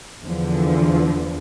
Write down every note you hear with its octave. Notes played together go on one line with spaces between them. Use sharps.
E2 D3 F3